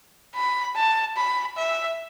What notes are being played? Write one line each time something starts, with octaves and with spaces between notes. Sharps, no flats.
B5
A5
B5
E5